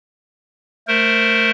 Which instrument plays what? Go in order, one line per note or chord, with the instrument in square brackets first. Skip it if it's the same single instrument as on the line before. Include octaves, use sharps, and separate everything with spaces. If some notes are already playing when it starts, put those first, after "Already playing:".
[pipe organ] A3 A#4 C5